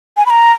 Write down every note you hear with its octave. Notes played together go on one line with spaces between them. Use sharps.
G#5
B5
A#5